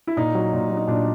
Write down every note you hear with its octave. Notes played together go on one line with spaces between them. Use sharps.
E4
A#2 D#4
F#3
A#2
F#3
D#4
A#2 D4